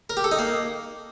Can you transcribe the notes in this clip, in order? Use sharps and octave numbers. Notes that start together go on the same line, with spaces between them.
A#4
G4
A4
D#4
A#3